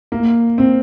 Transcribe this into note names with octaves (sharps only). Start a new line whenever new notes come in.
A#3
C4